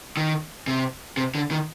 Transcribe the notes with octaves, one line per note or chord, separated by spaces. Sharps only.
D#3
C3
C3
D3
D#3